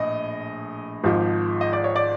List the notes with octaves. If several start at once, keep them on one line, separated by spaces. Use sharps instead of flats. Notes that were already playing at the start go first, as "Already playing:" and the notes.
Already playing: A#1 A2 D#5
G#1 G#2 F3
D#5
D5
C#5
D5